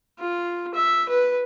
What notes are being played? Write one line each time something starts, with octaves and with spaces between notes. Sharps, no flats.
F4
E5
B4